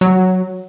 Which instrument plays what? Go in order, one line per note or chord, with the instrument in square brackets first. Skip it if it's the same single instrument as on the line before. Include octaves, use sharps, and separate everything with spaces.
[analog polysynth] F#3